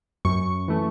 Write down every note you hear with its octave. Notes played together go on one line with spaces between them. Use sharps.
F#2 C#6
E3 A3